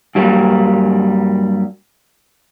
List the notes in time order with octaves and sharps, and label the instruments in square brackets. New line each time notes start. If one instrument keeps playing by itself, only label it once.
[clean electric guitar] G2 F#3 G3 A3 A#3